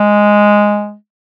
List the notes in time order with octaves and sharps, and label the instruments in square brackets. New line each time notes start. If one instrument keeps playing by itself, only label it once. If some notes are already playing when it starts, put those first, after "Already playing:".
Already playing: [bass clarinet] G#3